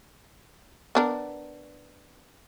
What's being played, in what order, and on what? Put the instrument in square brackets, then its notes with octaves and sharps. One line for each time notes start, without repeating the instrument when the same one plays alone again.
[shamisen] B3 D4 A#4